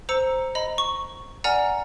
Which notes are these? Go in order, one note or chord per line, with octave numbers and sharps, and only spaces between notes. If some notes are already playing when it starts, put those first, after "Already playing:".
C5 A#5 E6 C#7
D#5 A#5 B5
C#6
D5 F#5 G#5 A#5 F6 C#7